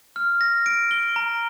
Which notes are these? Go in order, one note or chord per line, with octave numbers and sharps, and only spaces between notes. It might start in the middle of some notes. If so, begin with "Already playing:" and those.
F6
A#6
D7
G7
A#5